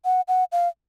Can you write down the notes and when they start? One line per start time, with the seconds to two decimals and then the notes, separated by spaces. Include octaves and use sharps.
0.05 F#5
0.28 F#5
0.52 F5